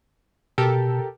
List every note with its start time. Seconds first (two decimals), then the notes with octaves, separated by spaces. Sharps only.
0.58 B2 G4 A4 A#4